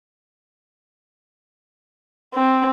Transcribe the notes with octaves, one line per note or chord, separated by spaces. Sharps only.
C4